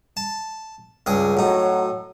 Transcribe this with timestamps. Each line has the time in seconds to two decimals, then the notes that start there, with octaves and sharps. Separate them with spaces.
0.17 A5
1.06 C#2 G2 G#4
1.37 A2 F#3 D#4